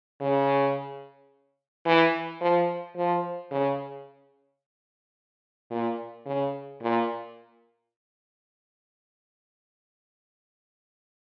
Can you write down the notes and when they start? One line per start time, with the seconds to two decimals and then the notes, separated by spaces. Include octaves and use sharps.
0.21 C#3
1.86 E3
2.41 F3
2.97 F3
3.51 C#3
5.71 A#2
6.26 C#3
6.81 A#2